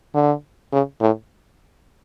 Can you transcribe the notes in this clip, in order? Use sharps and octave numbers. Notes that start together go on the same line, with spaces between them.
D3
C#3
A2